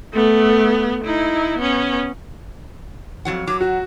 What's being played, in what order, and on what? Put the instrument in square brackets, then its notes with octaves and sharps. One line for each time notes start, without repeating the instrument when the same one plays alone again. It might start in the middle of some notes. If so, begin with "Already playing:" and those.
[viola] A3 B3
D#4 E4
B3 C#4
[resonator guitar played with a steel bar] F2 F#3 F#5
[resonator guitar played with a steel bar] F#3 [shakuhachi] D6
[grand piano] F#4 [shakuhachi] F#5